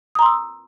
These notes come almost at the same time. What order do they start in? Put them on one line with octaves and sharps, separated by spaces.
D#6 A#5 C6 E6